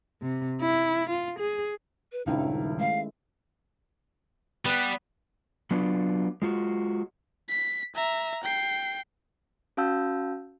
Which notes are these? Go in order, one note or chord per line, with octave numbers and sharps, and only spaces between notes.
C3
E4
F4
G#4
B4
D#1 C#2 G2 D#3 C#4 D#4 E4
G#3 A3 F5
G3 B3 B4
F#3 B3 D4 F4
G#3 F4 F#4
B6
E5 A#5
G5 C7
C#4 F#4 F5 A5 E6 G6